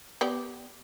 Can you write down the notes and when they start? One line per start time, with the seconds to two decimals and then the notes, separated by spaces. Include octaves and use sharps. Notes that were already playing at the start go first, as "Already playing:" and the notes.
0.21 B3 G4 D5